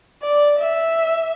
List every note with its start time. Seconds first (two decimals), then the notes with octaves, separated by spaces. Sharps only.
0.22 D5
0.59 E5